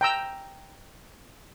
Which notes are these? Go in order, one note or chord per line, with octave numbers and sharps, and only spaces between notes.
G5 A#5 E6